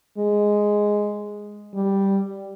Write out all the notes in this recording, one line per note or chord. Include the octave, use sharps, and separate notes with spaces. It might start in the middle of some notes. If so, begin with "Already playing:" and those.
G#3
G3